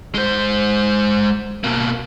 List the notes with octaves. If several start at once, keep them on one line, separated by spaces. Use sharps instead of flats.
G#3 C5
B2 A#3